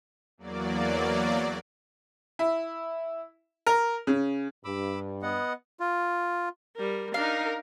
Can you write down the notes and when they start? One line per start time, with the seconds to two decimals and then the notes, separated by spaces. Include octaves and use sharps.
0.38 E2 F#3 A#3 D5
2.39 E4
3.67 A#4
4.07 C#3
4.65 G2 B5 D6 E6
5.22 B3 D#5 F#5
5.80 F4
6.76 G3 A#4
7.14 D4 D#4 A#4 F5